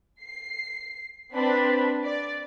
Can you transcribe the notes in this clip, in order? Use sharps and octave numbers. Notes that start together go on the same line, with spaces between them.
C7
C4 D4 B4 B5
D5